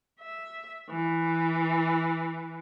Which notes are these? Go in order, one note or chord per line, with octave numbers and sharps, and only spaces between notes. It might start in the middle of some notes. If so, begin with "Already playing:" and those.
E5
E3